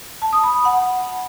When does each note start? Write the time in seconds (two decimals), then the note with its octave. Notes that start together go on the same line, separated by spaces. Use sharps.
0.22 A5
0.33 D#6
0.43 B5
0.54 B5
0.65 F#5